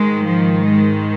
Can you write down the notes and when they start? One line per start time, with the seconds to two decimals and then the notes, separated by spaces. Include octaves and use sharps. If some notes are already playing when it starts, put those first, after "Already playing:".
Already playing: G#2 D#3 G#3
0.26 F3
0.66 G#3